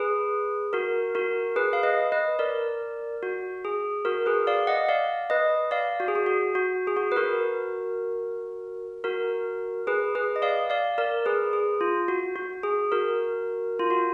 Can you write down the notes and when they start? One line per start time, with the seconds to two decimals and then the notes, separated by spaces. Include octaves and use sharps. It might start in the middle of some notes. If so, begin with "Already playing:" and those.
Already playing: G#4 B4
0.73 F#4 A#4
1.15 F#4 A#4
1.56 G#4 B4
1.73 F5
1.83 B4 D#5
2.12 B4 D#5
2.39 A#4 D5
3.23 F#4
3.65 G#4
4.05 F#4 A#4
4.26 G#4 B4
4.47 D5 F5
4.67 D#5 F#5
4.89 D5 F5
5.30 B4 D#5
5.71 D5 F5
6.00 F#4
6.08 G#4
6.15 F#4
6.26 F#4
6.55 F#4
6.87 G#4
6.97 F#4
7.12 B4
7.16 F#4 A#4
9.04 F#4 A#4
9.87 G#4 B4
10.15 G#4 B4
10.36 D#5
10.42 D5 F5
10.70 D5 F5
10.98 A#4 D5
11.26 G#4 B4
11.53 G#4
11.81 F4
12.08 F#4
12.36 F#4
12.63 G#4
12.92 F#4 A#4
13.79 F4
13.90 F#4